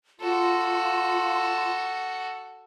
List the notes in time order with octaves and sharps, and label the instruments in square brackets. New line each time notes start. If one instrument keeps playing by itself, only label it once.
[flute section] F4 C6 [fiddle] F#4 A4